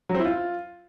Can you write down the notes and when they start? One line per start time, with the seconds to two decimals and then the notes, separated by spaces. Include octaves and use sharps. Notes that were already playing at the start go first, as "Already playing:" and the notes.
0.09 F#3
0.14 C4
0.20 E4
0.25 F4